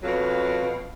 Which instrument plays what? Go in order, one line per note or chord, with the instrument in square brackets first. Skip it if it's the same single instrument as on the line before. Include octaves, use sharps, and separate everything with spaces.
[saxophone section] F2 B2 F#3 F5